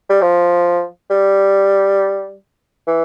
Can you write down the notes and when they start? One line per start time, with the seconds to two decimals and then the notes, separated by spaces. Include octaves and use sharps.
0.10 G3
0.22 F3
1.10 G3
2.87 E3